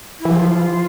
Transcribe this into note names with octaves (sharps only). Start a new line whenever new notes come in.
E4
E3
F3 F4 G#4